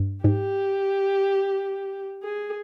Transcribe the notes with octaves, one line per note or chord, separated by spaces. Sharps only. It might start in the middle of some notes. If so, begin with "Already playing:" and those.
Already playing: G2
G#2 G4
G#4